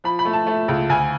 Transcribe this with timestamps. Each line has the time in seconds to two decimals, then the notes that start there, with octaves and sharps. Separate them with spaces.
0.04 F3 B5
0.19 B5
0.25 A3
0.33 A5
0.47 A3
0.68 C#2
0.89 D2 G#5